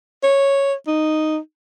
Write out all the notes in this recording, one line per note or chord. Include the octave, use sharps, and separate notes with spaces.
C#5
D#4